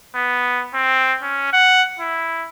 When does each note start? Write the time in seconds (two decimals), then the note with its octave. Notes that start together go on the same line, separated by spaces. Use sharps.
0.16 B3
0.74 C4
1.22 C#4
1.53 F#5
2.00 E4